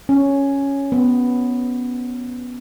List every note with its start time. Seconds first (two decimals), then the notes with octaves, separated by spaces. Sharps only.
0.09 C#4
0.92 B3